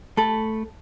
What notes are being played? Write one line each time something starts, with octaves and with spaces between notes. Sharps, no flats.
A3 A4 B5